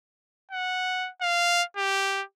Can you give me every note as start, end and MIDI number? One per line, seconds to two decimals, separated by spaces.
0.51 1.09 78
1.21 1.63 77
1.77 2.23 67